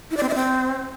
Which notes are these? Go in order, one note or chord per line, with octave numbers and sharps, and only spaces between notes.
E4
D5
C4
E5
C4